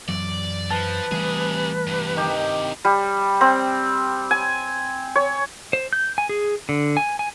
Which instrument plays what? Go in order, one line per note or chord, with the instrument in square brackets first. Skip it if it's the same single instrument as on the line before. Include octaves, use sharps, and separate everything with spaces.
[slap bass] F#2 E3 F#3 [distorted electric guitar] D5
[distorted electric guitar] F3 [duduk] B4 [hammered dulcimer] A5
[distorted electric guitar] C3 G#4 [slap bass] E3 G3 A3
[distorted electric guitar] G2 C3
[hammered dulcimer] D#3 G4
[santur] G3
C4
G#5
C#5
[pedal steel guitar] C5
G6
G#5
G#4
D3
G#5
G#5